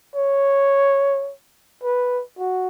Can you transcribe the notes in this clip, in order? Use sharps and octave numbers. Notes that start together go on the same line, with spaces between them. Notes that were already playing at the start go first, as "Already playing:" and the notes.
C#5
B4
F#4